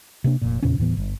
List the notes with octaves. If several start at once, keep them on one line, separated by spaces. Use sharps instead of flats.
C3 A#3 D4
F1 A#2
E2 A#2 C#3 C#4
D#1 A2 E3 B3
G1